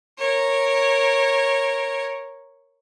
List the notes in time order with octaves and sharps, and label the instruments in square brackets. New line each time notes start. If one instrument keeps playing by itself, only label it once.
[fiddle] A#4 C#5